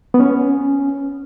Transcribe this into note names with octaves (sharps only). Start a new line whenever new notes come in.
B3
C#4